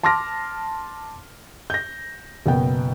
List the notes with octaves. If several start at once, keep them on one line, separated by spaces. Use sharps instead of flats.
A5 C6 D6 F6 A#6
G6 A#6
F#1 B2 B3 G5